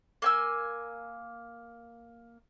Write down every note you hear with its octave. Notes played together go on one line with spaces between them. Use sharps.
A#3 G#5 E6